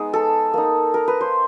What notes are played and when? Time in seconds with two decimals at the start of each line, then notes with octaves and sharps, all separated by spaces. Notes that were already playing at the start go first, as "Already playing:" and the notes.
Already playing: G#3 B3 D#4
0.14 A4
0.54 A#3 D#4
0.94 A#4
1.08 B4
1.21 C5